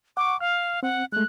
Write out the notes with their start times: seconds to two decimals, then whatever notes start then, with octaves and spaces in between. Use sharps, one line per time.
0.17 F#5 C#6 D6
0.41 F5 F6
0.83 C4 F#5
1.12 G#3 A3 F#6